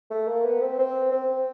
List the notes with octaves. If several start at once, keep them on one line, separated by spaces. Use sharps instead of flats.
A3
A#3
B3
C4
C4
C4